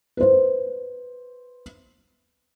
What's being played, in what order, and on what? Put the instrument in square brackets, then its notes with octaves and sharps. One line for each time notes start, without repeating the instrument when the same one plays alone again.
[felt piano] B4 C5